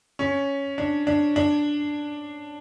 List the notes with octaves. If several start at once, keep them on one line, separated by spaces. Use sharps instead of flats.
C#4
D4
D4
D4